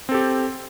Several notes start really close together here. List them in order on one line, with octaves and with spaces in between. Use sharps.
C4 A4 G4